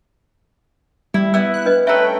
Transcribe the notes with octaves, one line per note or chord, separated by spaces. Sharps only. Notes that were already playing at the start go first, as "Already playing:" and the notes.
G3 E4
B3 E4 E6
F#6
D4 B4 D#5
A3 C#4 B4 E5 G5 A#5